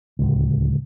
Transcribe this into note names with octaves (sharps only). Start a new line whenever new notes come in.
D1 C#2